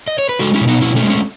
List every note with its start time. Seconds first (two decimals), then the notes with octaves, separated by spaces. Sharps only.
0.08 D#5
0.19 C#5
0.29 B4
0.39 G#3 F#4 A4
0.54 C#4 E4
0.61 B2
0.68 B3 D#4
0.81 B2 C#4 E4
0.96 A3 C#4
1.03 G#3
1.10 A3 C#4